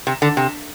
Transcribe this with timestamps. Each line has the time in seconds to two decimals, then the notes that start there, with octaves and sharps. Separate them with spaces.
0.07 C3
0.22 D3
0.37 C3